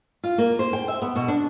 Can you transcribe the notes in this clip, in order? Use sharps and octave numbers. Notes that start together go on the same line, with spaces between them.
F4
A#3
C5
G5
E5
B3
B2
D4